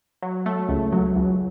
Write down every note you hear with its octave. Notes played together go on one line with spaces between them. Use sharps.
F#3
A3
C#2
F#3
C#2